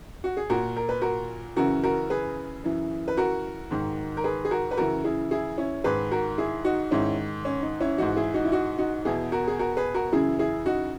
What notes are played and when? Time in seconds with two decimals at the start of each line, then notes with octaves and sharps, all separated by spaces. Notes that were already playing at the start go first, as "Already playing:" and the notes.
0.24 F#4
0.37 G#4
0.50 A#2 F#4 A#4
0.76 A#4
0.89 B4
1.02 F#4 A#4
1.56 F#2 C#3 E3 F#4 A#4
1.84 F#4 A#4
2.10 G#4 B4
2.64 F#2 E3
3.08 B4
3.17 F#4 A#4
3.71 G#2 D#3
4.17 A#4
4.24 G#4 B4
4.45 G#4
4.51 F#4 A#4
4.71 B4
4.77 F#2 C#3 E3 F#4 A#4
5.04 E4 G#4
5.31 E4 G#4
5.58 C#4 E4
5.84 G#2 D#3 G#4 B4
6.11 F#4 A#4
6.38 E4 G#4
6.65 D#4 F#4
6.91 G#2 D#3 C#4 E4
7.45 C#4
7.62 D#4
7.80 C#4 E4
7.98 G#2 E3 D#4 F#4
8.16 E4 G#4
8.34 D#4 F#4
8.45 E4
8.52 D#4 F#4
8.78 D#4 F#4
9.05 E2 B2 E4 G#4
9.32 F#4 A#4
9.48 G#4
9.59 F#4 A#4
9.77 G#4 B4
9.94 F#4 A#4
10.12 F#2 C#3 E3 E4 G#4
10.39 E4 G#4
10.66 D#4 F#4